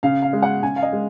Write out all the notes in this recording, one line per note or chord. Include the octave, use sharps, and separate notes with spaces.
C#3 F5
F5
G#3
F#5
C#3 G#5
F5
D#5
G#3